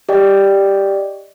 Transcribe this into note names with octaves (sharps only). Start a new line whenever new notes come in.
G4 D5 D#5 G5